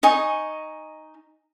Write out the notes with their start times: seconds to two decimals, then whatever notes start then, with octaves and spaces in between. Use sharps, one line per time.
0.03 D#4 D#5 G#5 C#6